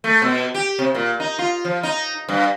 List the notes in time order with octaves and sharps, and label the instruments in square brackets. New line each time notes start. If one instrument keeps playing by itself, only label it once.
[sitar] A3
B2
G4
C3
A#2
D#4
F4
F3
D#4
G2